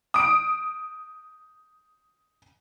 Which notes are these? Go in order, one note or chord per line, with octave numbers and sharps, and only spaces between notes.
D#6 D7